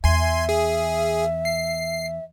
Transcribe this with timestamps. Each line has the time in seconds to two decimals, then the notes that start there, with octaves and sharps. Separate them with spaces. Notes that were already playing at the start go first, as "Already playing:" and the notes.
0.04 E2 E5 G#5 C6
0.19 E5
0.49 G#4
1.45 C7